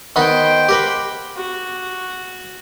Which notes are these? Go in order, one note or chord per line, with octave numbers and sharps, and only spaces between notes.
D#3 B3 D#4 C5 G5
G4 A#4 B4
F#4